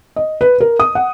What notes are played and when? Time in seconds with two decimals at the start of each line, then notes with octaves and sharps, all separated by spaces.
0.16 D#5
0.41 B4
0.60 A#4
0.80 D#6
0.95 F#5